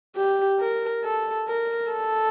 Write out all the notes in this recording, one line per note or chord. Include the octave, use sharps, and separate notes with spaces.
G4
A#4
A4
A#4
A4